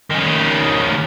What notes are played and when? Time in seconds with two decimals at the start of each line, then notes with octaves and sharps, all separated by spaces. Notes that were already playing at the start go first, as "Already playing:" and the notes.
0.10 D#3 C#4